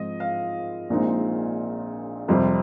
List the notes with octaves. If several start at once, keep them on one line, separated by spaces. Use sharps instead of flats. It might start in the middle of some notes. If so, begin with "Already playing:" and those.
Already playing: G#2 F3 G#3 C4 D#5
F5
A#1 A#2 G#3 C4 D#4
F2 C3 G3 C4